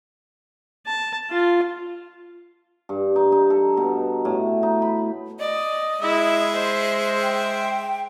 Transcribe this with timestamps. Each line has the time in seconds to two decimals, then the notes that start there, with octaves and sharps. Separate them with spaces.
0.87 A5
1.30 F4
2.89 G2
3.16 D#4
3.32 D#4
3.50 A4
3.77 B2
4.25 A2
4.63 D#4
4.82 B5
5.39 D5 D#5
6.01 G#3 E4 E5
6.53 C5
7.23 G5